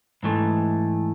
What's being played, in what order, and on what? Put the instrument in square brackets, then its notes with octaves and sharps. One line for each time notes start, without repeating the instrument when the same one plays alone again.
[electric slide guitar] G#2 E3 A3